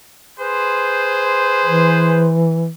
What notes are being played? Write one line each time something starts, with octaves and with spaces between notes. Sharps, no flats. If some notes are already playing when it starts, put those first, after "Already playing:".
G#4 B4 C5
E3